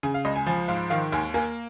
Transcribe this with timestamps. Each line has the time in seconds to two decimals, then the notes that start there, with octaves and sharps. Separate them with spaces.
0.03 C#3 G#5
0.14 F5
0.25 C#2 D#5
0.36 G#5
0.46 F3 G#5
0.68 G#2 F5
0.90 D#3 F5
1.12 D#2 G#5
1.34 A#3 G#5